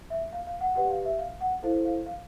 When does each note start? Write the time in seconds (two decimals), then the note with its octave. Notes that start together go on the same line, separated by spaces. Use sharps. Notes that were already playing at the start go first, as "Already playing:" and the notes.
0.10 E5
0.33 F5
0.47 F5
0.61 F#5
0.75 G4 B4 D5 F#5
0.90 F5
1.05 E5
1.19 F5
1.41 F#5
1.62 E4 A4 C5 F5
1.85 F5
2.06 F5